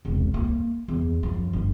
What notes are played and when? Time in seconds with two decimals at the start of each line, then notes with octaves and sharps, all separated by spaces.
0.05 E1 C2
0.34 A#3
0.88 E2
1.23 F#2 F3
1.53 G1